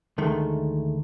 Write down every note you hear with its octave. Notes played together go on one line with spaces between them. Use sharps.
D2 D#3 G#3 A3